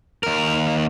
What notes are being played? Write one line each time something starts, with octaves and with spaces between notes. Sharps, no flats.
D#2 A#4